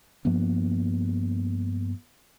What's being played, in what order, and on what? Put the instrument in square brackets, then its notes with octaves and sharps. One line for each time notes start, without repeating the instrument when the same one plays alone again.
[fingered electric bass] G2 F3 A#3 B3